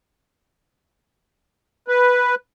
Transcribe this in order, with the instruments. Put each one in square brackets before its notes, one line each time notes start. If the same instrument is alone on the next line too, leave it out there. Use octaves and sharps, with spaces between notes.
[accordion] B4